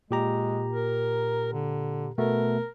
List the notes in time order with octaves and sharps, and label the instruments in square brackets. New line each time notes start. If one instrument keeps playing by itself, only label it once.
[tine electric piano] A#2 G4 A#5 [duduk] G#3
[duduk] A#4
D3
[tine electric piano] B2 A3 B3 [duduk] A#4